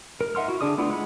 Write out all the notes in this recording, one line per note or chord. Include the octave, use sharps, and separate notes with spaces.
A#4
D#4 E5 F#5 C6 F6
E4 F#4
D3 D4 G#4 D5 D#6
A3 B3 D4 E4 F4
G#3 F#5 B5